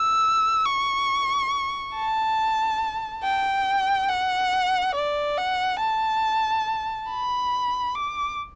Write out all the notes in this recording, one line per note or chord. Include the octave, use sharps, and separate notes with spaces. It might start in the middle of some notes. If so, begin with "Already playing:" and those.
Already playing: E6
C#6
A5
G5
F#5
D5
F#5
A5
B5
D6